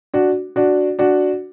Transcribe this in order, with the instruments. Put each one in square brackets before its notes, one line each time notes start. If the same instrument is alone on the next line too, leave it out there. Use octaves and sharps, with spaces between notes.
[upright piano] D4 F#4
D4 F#4
D4 F#4